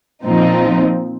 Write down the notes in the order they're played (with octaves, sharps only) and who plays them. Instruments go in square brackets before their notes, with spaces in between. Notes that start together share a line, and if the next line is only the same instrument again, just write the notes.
[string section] A#2 F3 C4 D#4